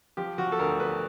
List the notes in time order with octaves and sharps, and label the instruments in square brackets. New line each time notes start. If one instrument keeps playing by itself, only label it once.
[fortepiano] F3 G4
F3 F#4
A4
D2 A#4
D2 B4